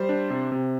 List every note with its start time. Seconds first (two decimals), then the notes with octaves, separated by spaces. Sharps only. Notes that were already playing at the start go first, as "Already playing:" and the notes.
Already playing: G3 C5
0.09 D4
0.30 C3
0.52 C3